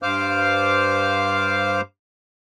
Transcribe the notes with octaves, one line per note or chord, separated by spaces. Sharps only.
G2 C5 F5 D6 F6